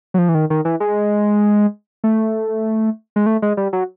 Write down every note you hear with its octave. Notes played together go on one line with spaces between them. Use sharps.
F#3
F3
E3
D#3
D#3
E3
G#3
A3
G#3
A3
G#3
G3
F#3